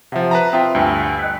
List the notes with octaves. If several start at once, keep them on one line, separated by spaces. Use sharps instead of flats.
C3 F3 C5 E5 F#5
B4 A5 A#5
C4 F4 E5 G5 D#6
D2 G2 G5 G#5
D#5 F#6 B6